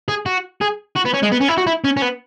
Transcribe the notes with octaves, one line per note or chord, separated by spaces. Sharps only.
G#4
F#4
G#4
F#4
B3
C#4
G#3
B3
C#4
E4
F#4
E4
C#4
C#4
B3